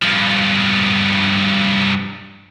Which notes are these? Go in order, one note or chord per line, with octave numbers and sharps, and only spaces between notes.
G2 F3